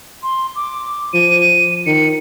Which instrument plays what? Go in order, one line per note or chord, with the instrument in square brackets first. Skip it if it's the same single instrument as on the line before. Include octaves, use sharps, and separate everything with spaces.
[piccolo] C6
D6
[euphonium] F3 [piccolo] D#7
[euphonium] D#3 [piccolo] C#7